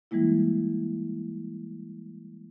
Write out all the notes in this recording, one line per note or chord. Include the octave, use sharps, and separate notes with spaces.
E3 G3 G#3 A#3 E4